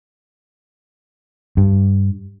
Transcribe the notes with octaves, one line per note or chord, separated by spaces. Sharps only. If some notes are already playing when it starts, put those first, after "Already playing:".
G2